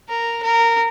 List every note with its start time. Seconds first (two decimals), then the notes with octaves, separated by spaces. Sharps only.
0.09 A#4
0.43 A#4